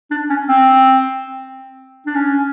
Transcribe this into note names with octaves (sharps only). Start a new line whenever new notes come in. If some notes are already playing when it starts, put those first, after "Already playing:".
D4
C#4
C4
D4
C#4